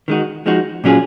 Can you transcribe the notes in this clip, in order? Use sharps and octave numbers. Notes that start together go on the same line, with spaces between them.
D#3 G#3 D#4 F#4
F3 G#3 D#4 F#4
A#2 F#3 C#4 F4 G#4